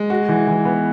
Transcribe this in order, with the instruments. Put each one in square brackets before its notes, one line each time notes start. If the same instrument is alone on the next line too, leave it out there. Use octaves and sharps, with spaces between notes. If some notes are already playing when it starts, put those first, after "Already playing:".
Already playing: [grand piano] G#3
F#4
E3
E3
B3